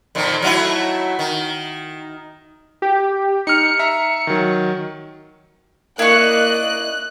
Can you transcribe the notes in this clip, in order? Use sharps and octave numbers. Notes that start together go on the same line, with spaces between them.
F2 A#2 D#3
F#3 A3 E4
D#3
G4
D#4 F6 C#7
E5 A#5
D#3 F#3
A#3 E4 D5 D#5 C#6 F#6